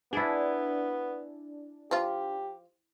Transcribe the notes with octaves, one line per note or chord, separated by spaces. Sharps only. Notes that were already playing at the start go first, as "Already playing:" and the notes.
B3 D4 E4 G#4
F3 F4 G4